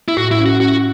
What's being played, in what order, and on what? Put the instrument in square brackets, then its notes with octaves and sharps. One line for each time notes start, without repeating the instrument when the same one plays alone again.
[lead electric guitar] E4
[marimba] A2 [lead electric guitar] F#4
[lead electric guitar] E4
[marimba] C#4
[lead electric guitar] F#4
[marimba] C#4 [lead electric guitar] F#4